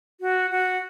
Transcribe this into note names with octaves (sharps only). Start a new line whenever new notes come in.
F#4
F#4